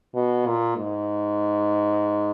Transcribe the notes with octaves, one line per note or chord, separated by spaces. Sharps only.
B2
A#2
G#2